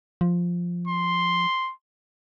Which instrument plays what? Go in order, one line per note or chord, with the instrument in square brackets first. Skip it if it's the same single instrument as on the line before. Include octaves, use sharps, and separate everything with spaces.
[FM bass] F3
[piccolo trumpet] C6